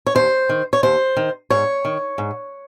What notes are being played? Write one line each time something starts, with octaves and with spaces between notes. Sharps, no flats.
C#5
D#2 C5
D#3
C#5
D#2 C5
D#3
G#2 C#5
D#3
G#2